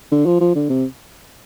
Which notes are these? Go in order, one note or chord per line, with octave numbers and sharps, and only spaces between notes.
D3
F3
F3
D3
C3